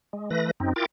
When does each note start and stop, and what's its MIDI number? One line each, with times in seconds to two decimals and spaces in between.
0.13 0.30 56
0.30 0.51 52
0.30 0.51 57
0.30 0.51 71
0.30 0.51 94
0.60 0.73 42
0.60 0.73 60
0.60 0.73 63
0.76 0.86 64
0.76 0.86 65
0.76 0.86 70
0.76 0.86 79
0.76 0.86 86
0.76 0.86 93